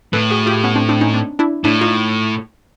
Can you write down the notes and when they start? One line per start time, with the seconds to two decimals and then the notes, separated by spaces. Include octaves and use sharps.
0.13 A2 A4 B4
0.30 F#4 G#4
0.46 F4 G4
0.64 B3 C#4
0.76 C4 D4
0.89 C4 D4
1.01 C#4 D#4
1.14 C4 D4
1.39 D4 E4
1.64 A2 D4 E4
1.81 D#4 F4